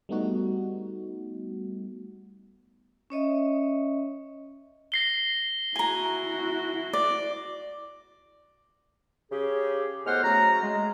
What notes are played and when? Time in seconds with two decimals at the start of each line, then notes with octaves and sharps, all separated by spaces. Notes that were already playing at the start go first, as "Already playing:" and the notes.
0.09 G3 A3 B3 D#4 F#4
3.10 C#4 C#5 D#5 E5
4.92 A#6 C7 G7
5.76 E4 F#4 G#5 A#5
6.93 D5
9.31 C#3 G4 G#4
10.06 A2 G#3 B3 C5 F#5 F6
10.23 C#3 F#3 A3 A#5
10.62 G#3